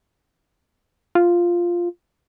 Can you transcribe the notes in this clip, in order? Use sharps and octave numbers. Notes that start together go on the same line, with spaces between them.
F4